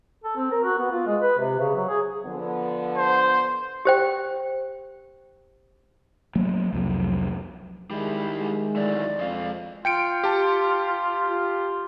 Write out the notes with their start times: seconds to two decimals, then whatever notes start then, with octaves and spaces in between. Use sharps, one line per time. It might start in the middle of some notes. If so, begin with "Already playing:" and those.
0.24 A4
0.37 C4
0.51 A#4
0.63 F#4
0.78 B3
0.91 F4
1.07 G#3
1.21 B4
1.38 C3
1.60 C#3
1.75 F#3
1.88 G#4
2.26 D3 F3 B3
2.97 C5
3.85 G4 C5 G5
6.35 F#3 A3 A#3
6.72 C2 F2 F#3
7.90 D#3 G3 G#3 E4
8.35 G#3
8.76 E3 F#3 A3 D5
9.19 F2 G#3 F5
9.85 F4 G5 C#7 D7
10.24 G4 A5
11.30 F4